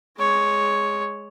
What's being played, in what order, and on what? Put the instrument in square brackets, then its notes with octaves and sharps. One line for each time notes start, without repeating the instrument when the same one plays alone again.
[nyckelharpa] G#3 C#5